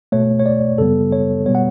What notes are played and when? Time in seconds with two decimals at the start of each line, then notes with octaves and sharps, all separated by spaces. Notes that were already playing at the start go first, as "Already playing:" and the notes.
0.12 B2 A3 C#5
0.39 C#5
0.46 D5
0.78 F#2 C#3 G3 B3 A4
1.12 C#5
1.46 B2 G3 B3 C#5
1.55 F#5